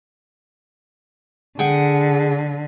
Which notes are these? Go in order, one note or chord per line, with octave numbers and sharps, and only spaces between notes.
D3 G#4 F#5 G5